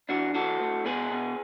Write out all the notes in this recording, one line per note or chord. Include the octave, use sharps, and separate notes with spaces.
E3 D4 F#4
E3 F#4 A4
A2
B2 G#4 B4
B2